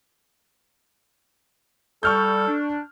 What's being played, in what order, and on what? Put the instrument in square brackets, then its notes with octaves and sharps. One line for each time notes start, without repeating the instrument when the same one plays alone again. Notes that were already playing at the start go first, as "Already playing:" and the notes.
[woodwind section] G3 [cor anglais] A4 [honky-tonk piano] C#6 F6 G6
[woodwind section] D4